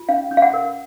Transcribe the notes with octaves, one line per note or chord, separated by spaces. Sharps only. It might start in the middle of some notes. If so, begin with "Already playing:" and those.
Already playing: F4
C#4 F5
C#4
F5
F#5
A#4